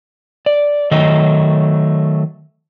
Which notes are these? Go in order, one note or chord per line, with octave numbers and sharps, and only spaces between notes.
D5
D#3 F#3 A3 D#5